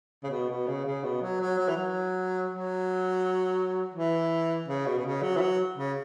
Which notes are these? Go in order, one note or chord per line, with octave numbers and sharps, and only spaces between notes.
C#3
B2
B2
C#3
C#3
B2
F#3
F#3
F#3
E3
F#3
F#3
E3
C#3
B2
B2
C#3
F#3
E3
F#3
C#3